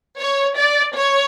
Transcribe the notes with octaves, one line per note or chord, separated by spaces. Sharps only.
C#5
D5
C#5